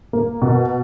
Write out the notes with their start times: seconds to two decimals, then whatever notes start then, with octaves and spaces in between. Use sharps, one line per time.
0.13 A#3
0.42 B2